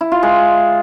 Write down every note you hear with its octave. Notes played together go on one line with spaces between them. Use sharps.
E4
F4
G#3